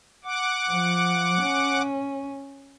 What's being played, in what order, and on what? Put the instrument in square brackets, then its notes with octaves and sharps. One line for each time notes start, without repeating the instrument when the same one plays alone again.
[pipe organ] F#5 D6
[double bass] F3
C#4